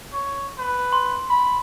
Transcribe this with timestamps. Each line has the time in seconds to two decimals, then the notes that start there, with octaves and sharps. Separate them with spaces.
0.13 C#5
0.58 B4
0.93 C6
1.30 B5